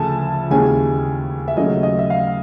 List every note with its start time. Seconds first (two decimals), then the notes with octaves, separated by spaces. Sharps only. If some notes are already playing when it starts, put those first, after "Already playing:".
Already playing: D2 C#3 F3 A3 G#5 A5
0.51 D#2 C#3 E3 G#3 C#4 G#5
1.48 E5
1.57 D#2 C#3 F#3 A3 C#4 D#5
1.83 D#5
1.99 E5
2.10 F5